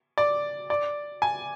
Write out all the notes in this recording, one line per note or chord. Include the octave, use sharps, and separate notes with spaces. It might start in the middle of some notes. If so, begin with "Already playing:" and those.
D5
D5
G#5